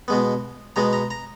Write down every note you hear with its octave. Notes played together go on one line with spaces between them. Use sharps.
B2 G#3 B3
B2 G#3 B3 A#5
A#5
A#5